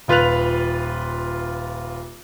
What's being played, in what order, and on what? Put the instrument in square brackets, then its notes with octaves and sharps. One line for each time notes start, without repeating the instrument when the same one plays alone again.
[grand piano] D#1 F4 B4 F#6 F7